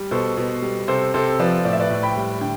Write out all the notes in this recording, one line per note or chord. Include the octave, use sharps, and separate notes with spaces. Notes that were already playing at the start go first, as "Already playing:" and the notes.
Already playing: G3
B2 A4 C5
B2
G3
C3 A4 C5
C3 A4 C5
F3 B4 D5
A2 D5
E5
B4 D5
A2
G5 B5
G3
D3 G5